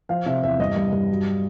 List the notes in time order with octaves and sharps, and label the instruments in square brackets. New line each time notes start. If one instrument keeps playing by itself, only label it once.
[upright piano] F3 F5
C3 E5
E2 E5
G2 D#5
G2
G2
F#3